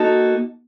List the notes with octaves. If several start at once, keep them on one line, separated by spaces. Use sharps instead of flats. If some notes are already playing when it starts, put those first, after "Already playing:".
Already playing: A#3 D#4 F#4 A4